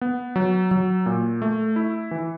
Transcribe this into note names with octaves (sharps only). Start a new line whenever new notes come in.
B3
F#3
F#3
A#2
A3
E4
E3